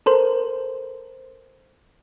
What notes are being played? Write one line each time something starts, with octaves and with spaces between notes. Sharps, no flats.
A4 A#4 C5